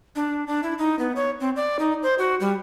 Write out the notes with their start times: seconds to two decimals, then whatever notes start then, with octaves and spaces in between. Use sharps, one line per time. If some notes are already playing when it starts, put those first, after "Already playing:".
0.16 D4
0.47 D4
0.63 E4
0.78 D#4
0.99 B3
1.16 C#5
1.40 C4
1.56 D5
1.79 D#4
2.03 C5
2.18 F#4
2.40 G3